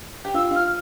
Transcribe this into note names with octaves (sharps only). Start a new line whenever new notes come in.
G4
F4 E6
F4 F6